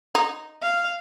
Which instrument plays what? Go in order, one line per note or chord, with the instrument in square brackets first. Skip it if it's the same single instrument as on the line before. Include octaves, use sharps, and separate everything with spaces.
[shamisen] D#4
[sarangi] F5